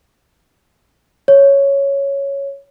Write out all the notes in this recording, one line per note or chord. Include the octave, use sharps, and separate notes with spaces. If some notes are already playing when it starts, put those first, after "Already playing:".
C#5